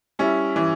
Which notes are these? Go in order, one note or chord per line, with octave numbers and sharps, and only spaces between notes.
G3 C#4 E4
E3